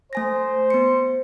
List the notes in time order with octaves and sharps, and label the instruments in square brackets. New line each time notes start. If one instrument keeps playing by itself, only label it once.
[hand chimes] A3 G#5 A#6 [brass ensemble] C5
[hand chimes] B3 C#7